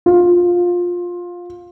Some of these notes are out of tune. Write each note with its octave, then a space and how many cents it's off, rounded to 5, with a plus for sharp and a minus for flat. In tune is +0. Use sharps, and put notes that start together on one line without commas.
F4 +15